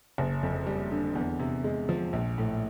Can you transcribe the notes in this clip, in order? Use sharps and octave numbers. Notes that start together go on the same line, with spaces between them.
F#1
F2
G3
D3
E2
C3
G#3
F3
A#1
A2